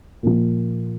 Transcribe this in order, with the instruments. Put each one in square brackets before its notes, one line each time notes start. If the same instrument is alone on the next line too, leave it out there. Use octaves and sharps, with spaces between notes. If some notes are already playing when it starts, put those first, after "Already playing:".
[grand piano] A#2 F3